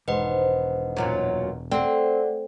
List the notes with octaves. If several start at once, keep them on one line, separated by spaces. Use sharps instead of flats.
E1 G#2 D#3 B4 C5 D#5 F#5
F#2 A#2 F#3
A3 C4 D5 F#5